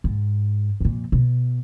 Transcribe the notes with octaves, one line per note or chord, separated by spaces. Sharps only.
G#2
F2 A#2
B2